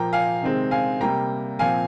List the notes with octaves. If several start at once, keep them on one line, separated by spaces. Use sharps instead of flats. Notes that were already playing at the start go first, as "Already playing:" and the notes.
Already playing: A#2 F3 A#3 G5 A#5
F5 G#5
C3 D#3 G#3 C4
F5 G#5
C3 G3 A#3 G5 A#5
A#2 F3 C4 F5 G#5